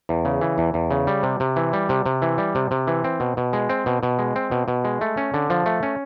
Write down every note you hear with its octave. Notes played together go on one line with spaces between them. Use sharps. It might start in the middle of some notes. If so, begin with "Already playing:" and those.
E2
C#3
E3
E2
E2
C#3
G3
C3
C3
E3
G3
C3
C3
E3
G3
C3
C3
E3
C4
B2
B2
G#3
C4
B2
B2
G#3
C4
B2
B2
G#3
A3
C#4
D3
F3
A3
C#4